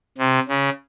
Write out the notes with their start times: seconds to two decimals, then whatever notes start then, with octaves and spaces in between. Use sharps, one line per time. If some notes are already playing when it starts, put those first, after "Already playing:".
0.18 C3
0.48 C#3